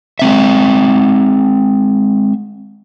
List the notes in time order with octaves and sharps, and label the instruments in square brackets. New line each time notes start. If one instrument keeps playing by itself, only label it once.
[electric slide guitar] G#3 C4 E5